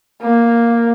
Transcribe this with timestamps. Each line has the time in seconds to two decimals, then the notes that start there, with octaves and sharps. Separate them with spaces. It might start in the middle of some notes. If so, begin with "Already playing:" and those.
0.22 A#3